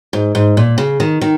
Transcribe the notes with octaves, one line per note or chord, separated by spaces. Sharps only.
G#2
G#2
A#2
C#3
D#3
D#3